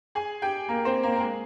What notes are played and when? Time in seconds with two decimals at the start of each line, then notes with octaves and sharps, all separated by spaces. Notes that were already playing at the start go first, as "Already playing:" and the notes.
0.15 G#4 G#5
0.42 G4 G5
0.69 A#3 A#4
0.85 C4 C5
1.03 A#3 A#4
1.16 A#4
1.20 G#3 G#4